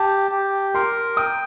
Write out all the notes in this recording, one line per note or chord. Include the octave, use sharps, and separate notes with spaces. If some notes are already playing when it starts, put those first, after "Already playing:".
Already playing: G4 A5
G4
A#4 C6
G5 D#6